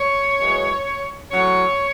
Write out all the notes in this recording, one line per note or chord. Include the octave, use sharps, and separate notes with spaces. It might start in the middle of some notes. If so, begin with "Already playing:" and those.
Already playing: C#5
F#2 E3 G#3
A2 F#3 C#4 C#5